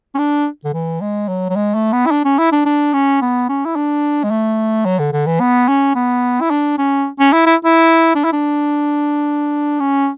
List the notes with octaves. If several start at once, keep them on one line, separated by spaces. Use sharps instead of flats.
C#4
D4
D3
E3
G#3
F#3
F#3
G#3
A3
B3
E4
D4
C#4
E4
D4
D4
C#4
B3
C#4
E4
D4
G#3
A3
F#3
D3
D3
E3
B3
C#4
B3
E4
D4
C#4
C#4
E4
E4
E4
D4
E4
D4
C#4